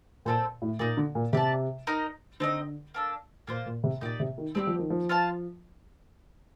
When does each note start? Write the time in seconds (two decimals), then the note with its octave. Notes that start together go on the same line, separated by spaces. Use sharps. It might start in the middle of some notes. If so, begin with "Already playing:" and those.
0.25 A#2 C4 D#4 A4 C5
0.62 A2
0.79 A#2 D#4 A#4 D5
0.97 D3
1.15 A#2
1.33 C3 G4 D5 A5
1.87 D#4 A#4 D#5
2.40 D3 C4 D#4 A4 D#5
2.94 A#3 D4 A4
3.47 A#2 A#3 F4 C5
3.66 A#2
3.84 C3
4.01 A#2 D#4 G4 D5
4.20 C3
4.38 D#3
4.55 G3 C4 D#4 G4
4.67 F3
4.79 D#3
4.90 F3
5.09 F4 C5 F5 A5